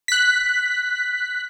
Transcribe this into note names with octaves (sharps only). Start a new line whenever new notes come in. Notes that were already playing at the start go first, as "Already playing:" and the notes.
F#6 B6